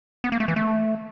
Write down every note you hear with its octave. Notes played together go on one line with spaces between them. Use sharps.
B3
A#3
A3
E3
A3